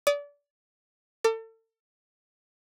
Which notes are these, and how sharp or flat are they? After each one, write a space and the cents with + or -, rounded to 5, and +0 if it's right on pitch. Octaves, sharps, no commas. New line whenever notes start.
D5 -30 D#6 +0
A4 +35 D6 -10